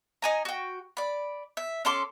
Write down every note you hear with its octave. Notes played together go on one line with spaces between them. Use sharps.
D#4 G#5 A#5
F#4 G5
D5 B5
E5
C#4 A4 C6 D6